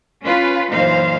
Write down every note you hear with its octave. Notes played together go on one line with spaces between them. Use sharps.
C#4 F4 B4
F#2 A#2 E3 D#4 C5 F5